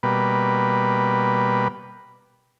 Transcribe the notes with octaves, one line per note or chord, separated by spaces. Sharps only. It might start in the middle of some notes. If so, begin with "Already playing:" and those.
B2 G3 A#3 B4